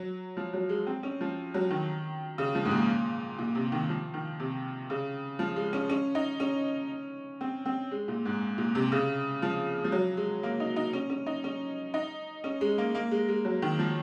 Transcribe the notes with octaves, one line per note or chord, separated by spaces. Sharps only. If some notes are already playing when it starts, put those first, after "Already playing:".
Already playing: F#3
F3
F#3
G#3
C4
C#4
F3
F#3
D#3
C#3
F3
G#2
A#2
A#2
C3
D#3
F3
D#3
C3
C#3
F3
G#3
C#4
C#4
D#4
C#4
C4
C4
G#3
A#2
G#2
A#2
C3
C#3
F3
F3
F#3
G#3
A#3
D#4
D#4
C#4
C#4
D#4
C#4
D#4
C#4
G#3
A#3
A#3
G#3
G#3
F#3
D#3
F3